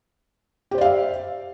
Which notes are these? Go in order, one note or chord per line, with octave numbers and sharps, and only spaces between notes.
G4 C5 D5 E5 F5